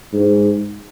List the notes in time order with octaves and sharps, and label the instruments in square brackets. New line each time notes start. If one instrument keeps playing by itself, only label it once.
[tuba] G#2